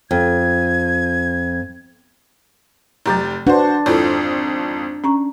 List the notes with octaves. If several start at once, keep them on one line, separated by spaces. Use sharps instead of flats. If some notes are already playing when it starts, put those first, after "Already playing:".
F2 G#6
F1 F#3 G4 A#5 A6
D4 F#4 B4 C5
G#1 F2 E4 F4 A4
C#4 A#5 C#6